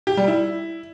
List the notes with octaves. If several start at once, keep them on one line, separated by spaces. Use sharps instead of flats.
G4
G3
E4